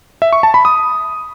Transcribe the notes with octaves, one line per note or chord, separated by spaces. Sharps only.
E5
C#6
A5
B5
D#6